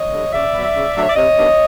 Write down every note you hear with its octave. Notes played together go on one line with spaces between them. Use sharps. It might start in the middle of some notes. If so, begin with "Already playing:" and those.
Already playing: C#5 D#5
D3 G3
C#3 D5 E5
F#3 B3
C#3
F#3 A3 D4 C#5
D5
C3 C#5 D#5
D#3 G3 B3 D4